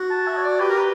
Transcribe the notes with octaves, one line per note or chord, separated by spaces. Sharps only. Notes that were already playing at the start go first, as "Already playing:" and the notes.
Already playing: F#4
A5
E5
C#5
D5
G4 B4
A#4
B4